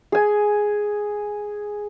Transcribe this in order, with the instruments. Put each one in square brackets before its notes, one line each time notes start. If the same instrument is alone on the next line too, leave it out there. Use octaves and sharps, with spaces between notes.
[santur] G#4 G#5